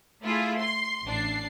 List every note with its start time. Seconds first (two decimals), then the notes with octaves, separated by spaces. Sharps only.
0.24 A3 E4 F4 G#4
0.59 C6 C7
1.05 A1 D4 C7